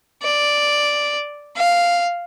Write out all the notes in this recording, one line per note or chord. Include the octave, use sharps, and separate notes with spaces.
D5
F5